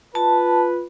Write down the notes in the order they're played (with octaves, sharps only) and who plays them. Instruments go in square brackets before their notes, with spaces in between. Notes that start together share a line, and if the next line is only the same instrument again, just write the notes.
[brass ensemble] F4 B4 [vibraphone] A5